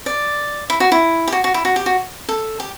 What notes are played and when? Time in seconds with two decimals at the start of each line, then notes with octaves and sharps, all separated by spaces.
0.06 D5
0.70 E4
0.80 F#4
0.92 E4
1.28 G4
1.33 F#4
1.44 F#4
1.54 E4
1.65 F#4
1.76 G4
1.86 F#4
2.29 A4
2.60 G4